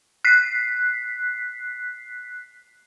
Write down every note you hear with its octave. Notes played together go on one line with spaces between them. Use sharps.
F#6 B6 C7